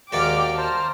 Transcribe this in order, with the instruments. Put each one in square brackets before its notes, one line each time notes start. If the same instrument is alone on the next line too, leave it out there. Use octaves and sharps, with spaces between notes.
[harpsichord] D#2 A#3 F#4 [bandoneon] G#3 D5 [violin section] G5 D6 F6
[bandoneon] C5 [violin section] A5 A#5 F6